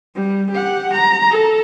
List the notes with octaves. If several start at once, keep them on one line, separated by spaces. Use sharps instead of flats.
G3
G4 F#5
A#5
A4